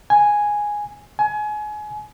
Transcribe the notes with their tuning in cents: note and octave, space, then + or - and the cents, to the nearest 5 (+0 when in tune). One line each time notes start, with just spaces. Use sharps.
G#5 +0
G#5 +30